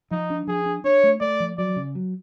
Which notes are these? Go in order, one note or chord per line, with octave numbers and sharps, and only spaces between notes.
F3 D#4
D4
F3 G#4
D4
D4 C#5
A3
A3 D5
F3
F#3 D5
C#3
F#3